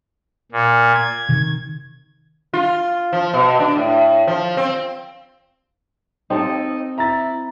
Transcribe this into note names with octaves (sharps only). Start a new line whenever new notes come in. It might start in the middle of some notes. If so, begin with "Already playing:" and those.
A#2
G#6
C3 D#3
F4
F3
B2
D4
A2
F3
C4
C4 D#4 A4
E4 A#5 A6